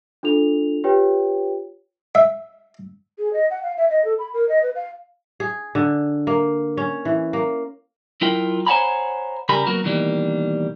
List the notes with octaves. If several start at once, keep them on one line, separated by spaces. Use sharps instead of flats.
D4 F4 A4 F7
F4 G4 B4 C#5 G5
E5
G#4
D#5
F#5
F5
E5
D#5
A4
B5
A#4
D#5
B4
F5
G#4
D3
A#3
C#4
E3
A#3
F#3 E4 F4 A#4 G5
C5 C#5 F#5 G#5 A#5 B5
C#3 G3 G4 A#4 G#5 B5
F#3 A#3 B3 F#4 A#4
B2 D#3 E3 G3 A#3